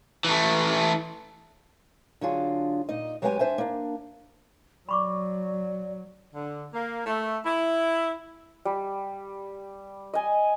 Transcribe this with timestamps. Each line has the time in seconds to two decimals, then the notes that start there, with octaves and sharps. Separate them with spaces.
0.25 E3 A3
2.21 D3 F#3 D4 F4 G#4
2.89 A#2 D#4 D#5
3.22 F#3 G#3 B3 G4 F#5 G#5
3.39 D4 C5 E5 G#5
3.58 A#3 D4
4.89 F#3 D5 B5 C#6 D6
6.34 D3
6.74 A#3
7.06 A3
7.45 E4
8.65 G3
10.14 D#5 G#5